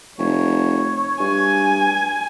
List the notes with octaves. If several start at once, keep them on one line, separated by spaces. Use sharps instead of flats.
F1 C#5
G2 G#5